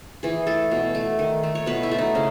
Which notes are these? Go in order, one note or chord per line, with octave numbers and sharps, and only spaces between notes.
E3 G#4
A3 A4
B2
A3
D#3
A3
C#5
B2 B4
E4
A3
D#4
C#3 C#4